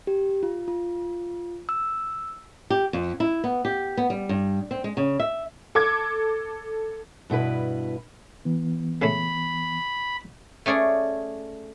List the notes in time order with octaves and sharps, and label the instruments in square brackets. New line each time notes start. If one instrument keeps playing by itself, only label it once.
[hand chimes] G4
F4
F4
E6
[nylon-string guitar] G4
F2
E4
B3
G4
B3
G3
G2
C4
G#3
C#3
E5
[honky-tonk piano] A4 D6 G#6
[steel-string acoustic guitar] G2 B2 E4 B4
[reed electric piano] E3 B3
[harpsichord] C#3 G#3 A3 [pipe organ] B5
[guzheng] A3 C#4 G#4 D5